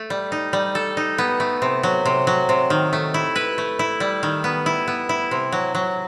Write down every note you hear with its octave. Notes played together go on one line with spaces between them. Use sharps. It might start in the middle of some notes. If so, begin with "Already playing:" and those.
Already playing: A3
G3
D#4
G3
A4
D#4
B3
A3
C3
F#3
C3
F#3
C3
D#3
A3
E4
B4
A3
E4
G3
D#3
B3
E4
B3
E4
C3
F#3
F#3